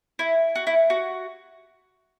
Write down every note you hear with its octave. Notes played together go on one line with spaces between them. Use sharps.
E4
F#4
E4
F#4